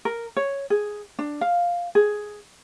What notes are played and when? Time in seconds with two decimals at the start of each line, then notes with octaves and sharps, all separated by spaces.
0.05 A#4
0.36 C#5
0.70 G#4
1.19 D4
1.41 F5
1.95 G#4